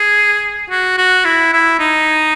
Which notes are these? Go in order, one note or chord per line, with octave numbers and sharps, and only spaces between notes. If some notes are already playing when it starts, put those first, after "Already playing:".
Already playing: G#4
F#4
F#4
E4
E4
D#4